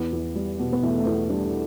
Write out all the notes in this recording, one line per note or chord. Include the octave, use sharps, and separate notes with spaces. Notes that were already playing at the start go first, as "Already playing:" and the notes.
Already playing: E2 B3
E2
G3
B2
B3
E2 A3
A3
E2 B3
G3 D4